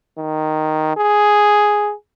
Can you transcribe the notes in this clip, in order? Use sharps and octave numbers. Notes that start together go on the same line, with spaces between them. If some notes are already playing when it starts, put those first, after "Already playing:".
D#3
G#4